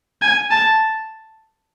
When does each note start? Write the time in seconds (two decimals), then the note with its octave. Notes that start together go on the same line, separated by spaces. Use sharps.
0.22 G#5
0.52 A5